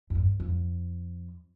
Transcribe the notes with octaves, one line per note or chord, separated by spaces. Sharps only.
F2
G2
F2